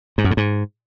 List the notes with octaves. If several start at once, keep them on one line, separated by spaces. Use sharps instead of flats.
G#2
F#2
A2
G#2